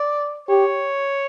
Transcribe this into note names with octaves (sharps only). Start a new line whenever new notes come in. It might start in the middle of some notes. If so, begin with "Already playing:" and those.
Already playing: D5
G4 C#5